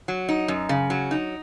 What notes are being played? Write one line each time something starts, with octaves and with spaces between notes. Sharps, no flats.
F#3
D#4
F#2
C#3
F#3
D#4